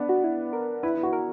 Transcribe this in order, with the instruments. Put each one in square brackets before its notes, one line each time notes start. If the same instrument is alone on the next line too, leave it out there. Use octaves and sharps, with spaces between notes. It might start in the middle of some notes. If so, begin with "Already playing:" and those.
Already playing: [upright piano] B3 D4
[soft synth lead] F#4
E4
A#4
[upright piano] E4 [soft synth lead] B4
[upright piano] E4
F#4
[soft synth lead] A#4